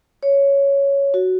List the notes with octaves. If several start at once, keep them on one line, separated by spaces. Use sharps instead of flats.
C#5
F#4